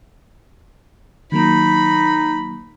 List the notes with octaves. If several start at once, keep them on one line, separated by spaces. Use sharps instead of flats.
D#3 F#3 A#3 D#4 B5